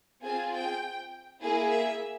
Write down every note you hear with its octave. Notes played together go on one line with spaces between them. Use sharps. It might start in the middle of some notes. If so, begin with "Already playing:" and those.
C4 F4 G#4 G#5
G5
A#3 E4 G#4
E5